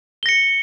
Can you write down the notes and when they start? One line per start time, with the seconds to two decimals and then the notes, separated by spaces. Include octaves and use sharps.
0.23 G7
0.26 A#6
0.29 C#7